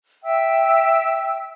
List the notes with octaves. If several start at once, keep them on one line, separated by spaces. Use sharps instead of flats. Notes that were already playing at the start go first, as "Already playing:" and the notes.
E5 G5 E6